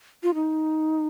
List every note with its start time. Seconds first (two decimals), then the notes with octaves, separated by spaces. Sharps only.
0.23 F4
0.34 D#4